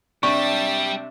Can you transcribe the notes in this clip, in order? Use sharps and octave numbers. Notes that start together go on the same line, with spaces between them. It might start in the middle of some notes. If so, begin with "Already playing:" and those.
C3 G3 D4 E5 A5 C#6